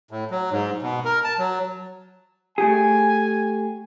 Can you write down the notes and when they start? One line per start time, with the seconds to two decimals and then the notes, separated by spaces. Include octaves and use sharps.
0.11 A2
0.31 F#3
0.51 G#2
0.82 B2
1.05 A#4
1.24 A5
1.39 F#3
2.58 A3 G4 G#4 G#5